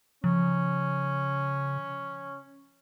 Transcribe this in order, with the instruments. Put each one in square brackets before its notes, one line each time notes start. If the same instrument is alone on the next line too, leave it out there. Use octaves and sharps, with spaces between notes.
[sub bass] C#3 [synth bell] F3 [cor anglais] C#4